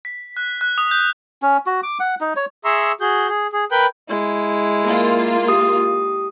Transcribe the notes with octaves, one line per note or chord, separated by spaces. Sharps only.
B6
F#6
F#6
D#6
G6
C#4
F#4
D6
F#5
D#4
C#5
G#4 E5 A#5 C6 C#6 E6
F#4 G#4 G6
G#4
G#4
A#4 B4 G5 B5 G6
G#3 E4
A#3 F4
G4 D#6